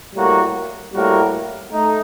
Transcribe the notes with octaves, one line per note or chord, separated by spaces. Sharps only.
A2 G3 A#3 F#4 A#4
A2 G3 A#3 F#4 A#4
A3 D#4